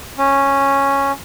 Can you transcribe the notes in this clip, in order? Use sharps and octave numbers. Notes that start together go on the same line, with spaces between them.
C#4